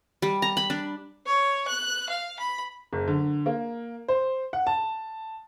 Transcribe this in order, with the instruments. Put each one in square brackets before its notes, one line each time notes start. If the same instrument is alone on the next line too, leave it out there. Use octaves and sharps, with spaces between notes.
[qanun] G3
A#5
B5
D4
[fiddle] C#5
F#6
F5
B5
[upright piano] F#1
D3
A#3
C5
F#5
A5